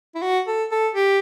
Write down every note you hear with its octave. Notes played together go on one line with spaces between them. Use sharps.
E4
F#4
A4
A4
G4